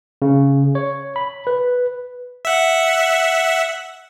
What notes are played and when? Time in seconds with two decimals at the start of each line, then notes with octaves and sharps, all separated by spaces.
0.22 C#3
0.75 C#5
1.16 B5
1.47 B4
2.45 E5 F#5